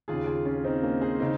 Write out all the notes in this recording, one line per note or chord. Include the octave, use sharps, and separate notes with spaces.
D#2 C#3 F4 G#4
F4 G#4
C#4 F4
C4 D#4
A#3 C#4
G#4 C5
C#3 C4 D#4